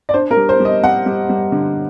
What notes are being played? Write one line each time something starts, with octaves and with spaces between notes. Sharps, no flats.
D5
D4 C5
A#4
G3
C5
G3
D#5
G3 F#5
G3
G3
D3